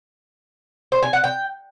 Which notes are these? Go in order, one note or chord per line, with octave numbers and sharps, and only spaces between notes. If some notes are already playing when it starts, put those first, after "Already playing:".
C5
G#5
F#5
G5